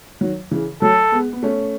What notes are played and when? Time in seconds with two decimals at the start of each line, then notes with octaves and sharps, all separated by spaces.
0.21 D#3 F#3
0.51 C#3 E3
0.82 F#3 A3 A4
1.12 G#3 B3
1.33 B3
1.43 A3 C#4